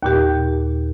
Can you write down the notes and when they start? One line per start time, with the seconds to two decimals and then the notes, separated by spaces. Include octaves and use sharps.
0.03 D#2 A#2 G4